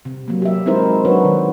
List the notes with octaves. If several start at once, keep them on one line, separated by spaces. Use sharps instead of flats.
C3
F#3 A#3
G4 E5
G#3 C4 D#4 E4 A#4 C5
F#3 C4 D4 F#4 B4 C#5
D#3